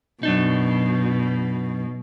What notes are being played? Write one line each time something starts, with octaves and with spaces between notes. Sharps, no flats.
F#2 B2 D4 D#4